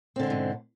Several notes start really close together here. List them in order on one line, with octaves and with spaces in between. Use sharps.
C4 D3 G#3 B2 G#2